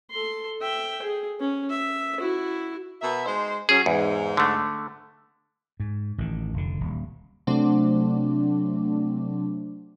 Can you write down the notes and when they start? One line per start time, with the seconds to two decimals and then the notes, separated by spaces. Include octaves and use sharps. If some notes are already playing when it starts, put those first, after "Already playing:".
0.11 A4 C6
0.61 E5 G5
1.02 G#4
1.40 C#4
1.70 E5
2.19 E4 F#4
3.01 B2 A#4 E5
3.26 G#3 D#4 C5
3.69 F#3 C#4 G#4
3.86 E2 G#2
4.37 D3 A3
5.80 G#2
6.18 A1 D#3
6.53 F1 D3
6.81 D#1
7.47 C3 F#3 A3 C4 D4